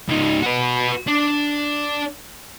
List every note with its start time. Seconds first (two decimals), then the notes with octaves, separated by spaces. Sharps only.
0.09 C#2 D#4
0.43 F#4 B4
1.07 D4